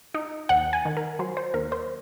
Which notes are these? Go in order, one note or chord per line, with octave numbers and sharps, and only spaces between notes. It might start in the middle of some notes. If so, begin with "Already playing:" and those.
D#4
D#2 F#5
G#5
D#3
A#4
F#3 C5
C5
D#2 A#4
C5